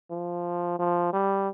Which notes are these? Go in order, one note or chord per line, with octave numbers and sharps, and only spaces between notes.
F3
F3
G3